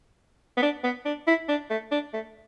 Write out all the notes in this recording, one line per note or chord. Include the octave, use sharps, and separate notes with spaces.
B3
D4
B3
D4
E4
D4
A3
D4
A3